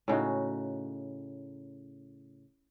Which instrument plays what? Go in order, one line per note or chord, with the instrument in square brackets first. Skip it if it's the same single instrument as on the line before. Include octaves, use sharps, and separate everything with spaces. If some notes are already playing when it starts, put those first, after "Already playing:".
[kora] A2 C#3 D#4 F#4